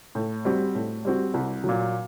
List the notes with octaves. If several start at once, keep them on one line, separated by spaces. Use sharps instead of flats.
A2
G3 C4 F#4
A2
G3 C4 F#4
C2
F#3
A#2